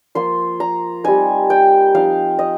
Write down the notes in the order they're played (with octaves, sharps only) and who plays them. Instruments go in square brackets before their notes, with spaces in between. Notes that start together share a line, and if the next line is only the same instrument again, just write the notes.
[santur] F3 A#3 F4 C6
A#5
G3 C4 D#4 G#5
G5
F3 C4 D#4 F5
D#5